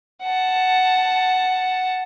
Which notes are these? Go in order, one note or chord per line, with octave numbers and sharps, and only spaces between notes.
F#5 A5